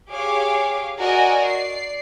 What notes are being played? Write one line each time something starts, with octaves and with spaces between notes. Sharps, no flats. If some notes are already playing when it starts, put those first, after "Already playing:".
G4 G#4 C#5 F5 D6
F#4 A#4 D5 D#5 G#5
D5 C7